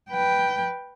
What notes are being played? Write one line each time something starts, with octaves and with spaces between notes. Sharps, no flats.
B4 G5